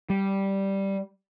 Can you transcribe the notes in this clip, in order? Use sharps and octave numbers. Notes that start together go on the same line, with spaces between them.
G3